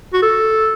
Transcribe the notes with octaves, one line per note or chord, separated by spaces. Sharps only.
F#4
A4